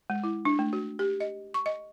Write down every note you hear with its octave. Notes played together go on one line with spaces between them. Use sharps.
G#3
E4
D4
A3
F#4
G4
D#5
C#6
D#5